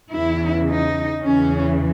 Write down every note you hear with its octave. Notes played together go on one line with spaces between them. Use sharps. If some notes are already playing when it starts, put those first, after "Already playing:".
E2 C#3 E3 E4
D#4
E2 C#3 E3 C#4